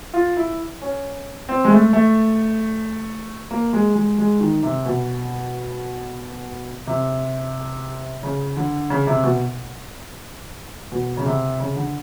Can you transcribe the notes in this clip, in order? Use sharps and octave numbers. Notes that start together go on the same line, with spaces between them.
F4
E4
C#4
C4
G#3
A3
A3
A#3
G#3
G#3
G#3
D#3
C3
B2
C3
C#3
D3
C#3
C3
B2
B2
C#3
C3
C#3
D3